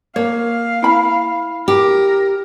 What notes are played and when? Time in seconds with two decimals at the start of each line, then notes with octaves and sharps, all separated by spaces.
0.16 A#3 C#5 F5
0.82 E4 B5
1.68 G4 A#4